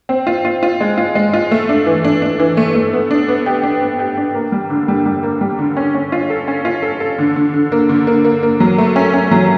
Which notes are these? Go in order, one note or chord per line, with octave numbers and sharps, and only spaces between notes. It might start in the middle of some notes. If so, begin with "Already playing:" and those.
C4
F4
F4
F4
G#3
F4
G#3
F4
A3
D4
E3
D4
D4
E3
A3
A3
B3
D4
B3
G4
D4
B3
G4
D4
A#3
G3
D3
G3
G3
A#3
G3
D3
C#4
C#4
F4
A4
C#4
F4
A4
A4
D3
D3
D3
A#3
D3
A#3
A#3
A#3
F#3
A3
C#4
C#4
F#3